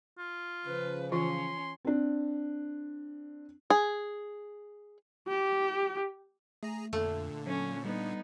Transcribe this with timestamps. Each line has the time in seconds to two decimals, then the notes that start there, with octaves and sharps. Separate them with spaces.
0.18 F4
0.66 C#3 F3 B4
1.12 E3 C#4 F4 C6
1.85 C4 D4
3.70 G#4
5.28 G4
6.63 A3 G#4 A#5
6.93 F2 A#2 D3 A3
7.46 F#3 C#4
7.85 G3 B3 D#4